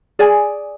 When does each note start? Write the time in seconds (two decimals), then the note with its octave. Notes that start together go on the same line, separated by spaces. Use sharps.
0.19 G#4 D5 G#5